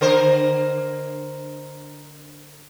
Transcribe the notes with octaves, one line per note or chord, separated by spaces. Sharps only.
D3 A#4 C5